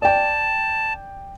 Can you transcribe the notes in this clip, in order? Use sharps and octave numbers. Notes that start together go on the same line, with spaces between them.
D5 G5 A5